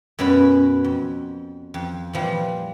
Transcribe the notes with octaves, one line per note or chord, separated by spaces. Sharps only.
F#2 B2 B3 C#4 A#4 B5
F2
F2
A#2 E3 F3 G3